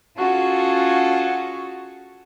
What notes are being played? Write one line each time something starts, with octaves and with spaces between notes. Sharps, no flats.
C#4 F4 F#4 G#4 A4